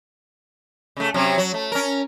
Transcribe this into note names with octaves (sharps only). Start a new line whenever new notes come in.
C#3 A3
C3 F#3 C#4
F#3
A3
C#4 A#4